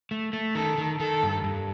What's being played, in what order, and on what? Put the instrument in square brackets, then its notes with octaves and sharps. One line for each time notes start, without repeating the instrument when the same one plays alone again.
[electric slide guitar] A3
A3
[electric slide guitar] D#3 [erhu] A4
[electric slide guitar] D#3
[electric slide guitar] D#3 [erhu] A4
[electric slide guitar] G2
G2